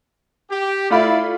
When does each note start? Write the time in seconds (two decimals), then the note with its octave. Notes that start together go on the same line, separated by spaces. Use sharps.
0.51 G4
0.90 A3 E4 F4 D5 B5